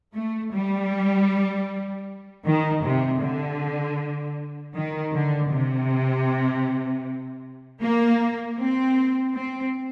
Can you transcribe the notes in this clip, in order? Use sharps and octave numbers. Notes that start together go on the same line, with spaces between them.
A3
G3
D#3
C3
D3
D#3
D3
C3
A#3
C4
C4